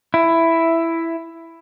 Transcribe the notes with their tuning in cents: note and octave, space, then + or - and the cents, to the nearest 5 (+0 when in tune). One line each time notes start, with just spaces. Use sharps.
E4 +5